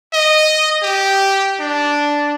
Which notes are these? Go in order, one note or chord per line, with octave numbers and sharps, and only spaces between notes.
D#5
G4
D4